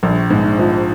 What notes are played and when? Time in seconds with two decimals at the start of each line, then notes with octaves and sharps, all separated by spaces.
0.03 A#1
0.30 G#2
0.59 F3